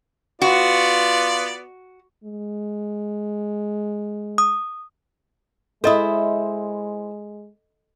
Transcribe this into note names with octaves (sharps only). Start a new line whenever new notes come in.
B3 F4 F#4 D5
G#3
D#6
G#3 E4 A4 C5 D#5 D#6